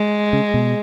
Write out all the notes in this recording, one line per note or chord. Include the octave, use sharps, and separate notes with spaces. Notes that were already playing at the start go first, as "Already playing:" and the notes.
Already playing: G#3
C#3
B2